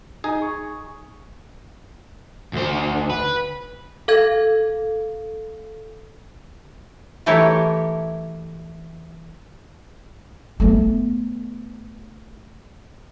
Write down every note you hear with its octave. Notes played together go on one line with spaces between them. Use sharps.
D#4 G#4
C#6
D2 C5
B4
A4 F5 G#6
E3 A3 E4 G4 A#4 C#5
A3 B3